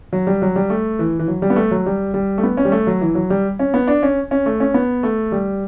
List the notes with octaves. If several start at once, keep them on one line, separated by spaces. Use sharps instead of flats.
F#3
G3
F#3
G3
A3
E3
E3
F#3
G3
B3
A3
F#3
G3
G3
A3
B3
C#4
G3
A3
F#3
E3
F#3
G3
C#4
B3
D4
C#4
C#4
A3
C#4
B3
A3
G3